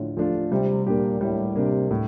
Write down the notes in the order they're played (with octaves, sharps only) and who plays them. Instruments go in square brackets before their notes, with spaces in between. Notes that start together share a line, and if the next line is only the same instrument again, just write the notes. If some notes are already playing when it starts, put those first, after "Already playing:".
Already playing: [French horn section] A2 [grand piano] D3 F3 A3 F4
[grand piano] F3 A3 D4 F4
[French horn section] C3 [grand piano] G3
[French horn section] A#2 [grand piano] A#3 D4 G4
[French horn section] A2 [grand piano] G3
[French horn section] C3 [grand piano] A#3 D4 G4
[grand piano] A2